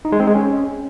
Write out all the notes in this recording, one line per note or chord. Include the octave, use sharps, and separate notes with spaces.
D#4
G#3
C4
G#3
C#4